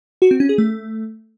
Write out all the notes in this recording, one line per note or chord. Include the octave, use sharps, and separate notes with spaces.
F#4
C4
C#4
G#4
A3